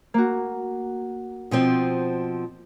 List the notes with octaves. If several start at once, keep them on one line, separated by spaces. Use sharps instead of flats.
A#3 F#4
B2 F3 C4